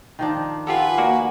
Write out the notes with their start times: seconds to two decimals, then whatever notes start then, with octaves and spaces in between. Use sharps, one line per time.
0.19 D#3 F3 D4
0.67 F4 G4 A4 B4 F#5 G#5
0.98 A#3 F#4 D5